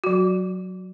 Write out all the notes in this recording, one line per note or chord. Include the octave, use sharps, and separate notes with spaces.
F#3 F#4